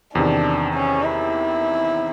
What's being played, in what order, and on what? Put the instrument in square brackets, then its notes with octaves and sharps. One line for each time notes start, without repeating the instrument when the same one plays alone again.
[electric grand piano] E2 C3 D#3 [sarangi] D4
[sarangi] C#4
E4